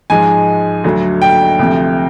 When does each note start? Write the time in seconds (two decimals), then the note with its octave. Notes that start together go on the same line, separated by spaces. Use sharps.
0.10 G#2 F3 G#3 G#5
0.84 D2 D3 F#3
1.22 G5
1.59 D2 C3 F3